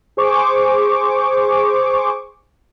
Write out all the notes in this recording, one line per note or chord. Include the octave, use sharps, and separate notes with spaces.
G#4 C5 C#6 D6